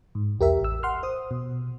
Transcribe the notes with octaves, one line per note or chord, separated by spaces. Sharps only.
G#2
B1 E2 G4 A#4 E5
A1 E6
F#5 C6 F6
C5 D#6
B2